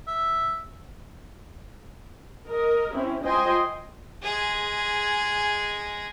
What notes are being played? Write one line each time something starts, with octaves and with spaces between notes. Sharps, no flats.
E5
A#4 D#5
C4 C#4 E4
F4 C5 D#5 G5 G#5 C6
G#3 G#4